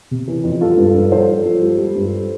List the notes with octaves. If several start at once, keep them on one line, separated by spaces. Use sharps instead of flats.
C3
E3
F2
G3 F4 A4
G2
G2
F3 A4 C5
F3
F3
G3
G3
G2